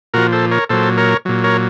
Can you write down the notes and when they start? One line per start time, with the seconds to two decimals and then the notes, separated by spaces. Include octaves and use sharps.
0.14 A#2 F3 F#4 A#4
0.32 A4 C5
0.51 A#4 C#5
0.69 A#2 F#3 A4 C5
0.97 A#4 C#5
1.25 A#2 F#3
1.44 A#4 C#5